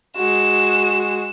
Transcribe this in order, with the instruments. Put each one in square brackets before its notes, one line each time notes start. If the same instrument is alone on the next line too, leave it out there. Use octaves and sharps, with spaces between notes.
[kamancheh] G#3 F#4 [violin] E7